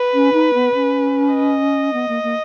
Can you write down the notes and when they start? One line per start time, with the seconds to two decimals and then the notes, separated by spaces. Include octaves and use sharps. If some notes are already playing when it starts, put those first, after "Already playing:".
Already playing: B4
0.14 C#4
0.33 D#4
0.54 B3
0.74 C#4
1.34 D#5
1.93 B3
2.09 A#3
2.23 A#3